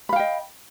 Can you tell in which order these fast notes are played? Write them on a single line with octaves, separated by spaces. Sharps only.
B5 F5 G5 D#5